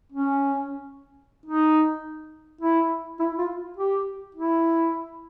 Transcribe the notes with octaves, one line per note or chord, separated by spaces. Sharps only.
C#4
D#4
E4
E4
F4
G4
E4